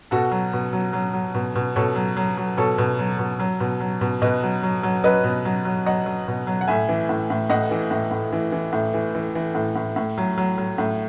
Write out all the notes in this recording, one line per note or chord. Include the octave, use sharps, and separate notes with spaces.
B2 F#4 A4
F#3
B2
F#3
F#3
F#3
B2
B2
B2 A4 C#5
F#3
F#3
F#3
B2 A4 C#5
B2
F#3
B2
F#3
B2
F#3
B2
B2 B4 D#5
F#3
F#3
F#3
F#3 B4 D#5
B2
F#3
F#3
F#3 D#5 F#5
F#3
B2
F#3
F#5
A2 E5 G#5
E3
A2
A2
A2 D#5 F#5
E3
A2
A2
E3
E3
A2
E3
E3
E3
A2
A2
A2
F#3
F#3
F#3
A2